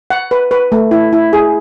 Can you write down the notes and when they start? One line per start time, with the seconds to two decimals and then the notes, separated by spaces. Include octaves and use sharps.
0.10 F#5
0.31 B4
0.51 B4
0.72 A3
0.91 E4
1.13 E4
1.33 G#4